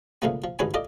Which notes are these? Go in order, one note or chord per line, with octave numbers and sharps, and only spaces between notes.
C#2 A#2 F3 A3 B3
F3
A1 D2 G#2 B4 C#5 G#5
F4 A4 D5 D#5